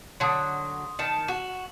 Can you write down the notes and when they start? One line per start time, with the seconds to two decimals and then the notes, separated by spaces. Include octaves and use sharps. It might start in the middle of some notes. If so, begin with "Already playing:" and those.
0.20 D3 F#3 C6 D#6
0.99 D#3 A5 C#7 E7
1.28 F#4